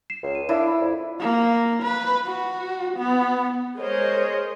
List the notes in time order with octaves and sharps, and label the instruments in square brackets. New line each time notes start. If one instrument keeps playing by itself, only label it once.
[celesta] C7 E7
[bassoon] C#2
[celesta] D#7
[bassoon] D4 [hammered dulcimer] E4 [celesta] A#4 E5 F5
[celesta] B5
[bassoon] F2
[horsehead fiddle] A#3
B4
F#4
B3
[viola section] G#3 G#4 A#4 C5 C#5 D#5